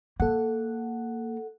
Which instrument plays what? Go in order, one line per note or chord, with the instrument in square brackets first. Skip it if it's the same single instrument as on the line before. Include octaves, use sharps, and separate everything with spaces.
[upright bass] A#3 [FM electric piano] A4 F#5